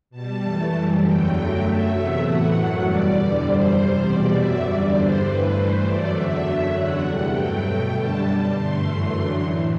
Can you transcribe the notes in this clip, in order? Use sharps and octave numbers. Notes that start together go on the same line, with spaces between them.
B2 G3 A5
F#2 E3 A3
F#2 E3 G3
E2 D3 F#3 A3 G5
F#2 F#3 A3
F#2 F#3 A3 E5
E2 C3 F#3 A3
A2 E3 A3 F#5
F#2 F#3 A3 F#5
E2 B2 G3 D5
E2 D3 G3
F#2 E3 G3 C5
E2 C3 G3
E2 B2 G3 D5
F#2 F#3 A3 E5
E2 D3 G3 D5
G2 D3 G3 C5
G2 E3 A3 B4
G2 E3 A3 C5
F#2 F#3 A3 D5
E2 D3 F#3 A3 E5
F#2 F#3 A3
E2 D3 F#3 A3 F#5
E2 C3 G3
G2 F#3 A3 G5
B2 A3 G5
F#2 D3 G3 A5
B2 G3
G2 D3 A3 C6
F#2 E3 A3
F#2 D3 F#3 A3
A2 E3 A3